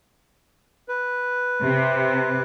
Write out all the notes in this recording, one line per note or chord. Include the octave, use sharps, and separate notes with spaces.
B4
C3